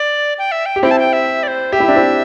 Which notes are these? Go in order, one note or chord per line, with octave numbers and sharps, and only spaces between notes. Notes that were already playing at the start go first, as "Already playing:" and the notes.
Already playing: D5
G5
E5
G5
G4
C4 E4 G5
A5
G5
E5
D5
C5
G4 E5
E4
D4
C4 E4